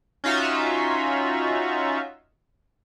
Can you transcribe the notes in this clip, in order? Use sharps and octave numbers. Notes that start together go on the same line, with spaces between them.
C#4 D#4 F4 F#4 E5